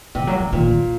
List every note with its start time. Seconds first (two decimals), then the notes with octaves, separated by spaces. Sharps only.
0.15 C3 D#3
0.27 F#3
0.40 D#3
0.53 A#2 D#3
0.71 D3